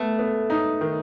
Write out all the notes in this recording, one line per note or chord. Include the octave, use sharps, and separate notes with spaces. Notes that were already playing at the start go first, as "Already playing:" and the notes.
Already playing: A3 B3
B3
D#4
D#3